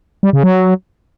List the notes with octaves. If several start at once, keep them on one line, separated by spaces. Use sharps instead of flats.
G3
C#3
F#3